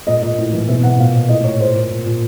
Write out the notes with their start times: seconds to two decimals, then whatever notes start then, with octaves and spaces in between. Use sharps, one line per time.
0.07 A#2 D#5
0.22 A#2 D#5
0.38 A2
0.53 E3
0.68 B2 E5
0.83 B2 F#5
0.98 A#2 F5
1.15 A#2
1.29 A2 D#5
1.44 A2 C#5
1.60 A#2 C5
1.75 A#2
1.91 A#2
2.06 A#2